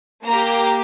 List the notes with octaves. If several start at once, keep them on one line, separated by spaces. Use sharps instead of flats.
A#3 A#5
G4